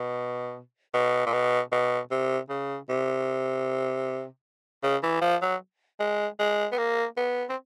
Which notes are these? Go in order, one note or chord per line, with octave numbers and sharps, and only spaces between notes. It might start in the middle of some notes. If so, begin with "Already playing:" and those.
Already playing: B2
B2
A#2
B2
B2
C3
C#3
C3
C#3
E3
F3
F#3
G#3
G#3
B3
A#3
B3
C4